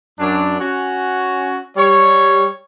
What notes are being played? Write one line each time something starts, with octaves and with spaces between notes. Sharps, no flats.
F#2 D4
C#4 F#4
G3 C#5